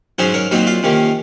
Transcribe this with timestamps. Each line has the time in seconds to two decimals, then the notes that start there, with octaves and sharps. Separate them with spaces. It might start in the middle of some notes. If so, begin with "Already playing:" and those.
0.19 G#2 F#3 C#4 G#4 C5
0.34 A#4 C#5
0.51 A#2 F#3 C4 D#4 F#4
0.67 F4
0.83 C3 D#3 A#3 C#4